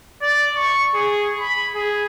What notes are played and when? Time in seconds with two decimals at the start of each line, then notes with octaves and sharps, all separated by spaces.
0.22 D5
0.56 C#6
0.95 G#4
1.40 B5
1.75 G#4